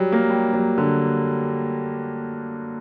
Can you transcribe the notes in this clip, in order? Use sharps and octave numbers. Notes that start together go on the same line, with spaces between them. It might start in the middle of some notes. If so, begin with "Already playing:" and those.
Already playing: F#3 G3
A#3
G3
F#3
D3